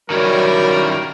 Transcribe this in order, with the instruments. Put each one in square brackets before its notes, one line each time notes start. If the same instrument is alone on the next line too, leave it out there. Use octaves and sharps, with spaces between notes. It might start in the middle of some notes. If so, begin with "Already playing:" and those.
[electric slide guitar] D#3 C#4 E4 [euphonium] F#3 [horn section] G3 A#4